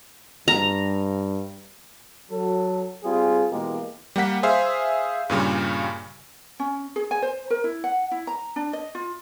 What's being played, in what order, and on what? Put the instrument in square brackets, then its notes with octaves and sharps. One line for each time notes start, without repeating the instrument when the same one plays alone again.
[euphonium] G2 [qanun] A#5
[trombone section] F#3 A4
G3 C4 F4 G#4
B2 E3 G#3 A#3 G4 A#4
[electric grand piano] G3 A#3 F#5 B6
G#4 C5 E5 F5
G2 A#2 C#3 G3
[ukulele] C#4
G#4
G#5
C5
A#4
E4
F#5
E4
A#5
D4
D#5
F4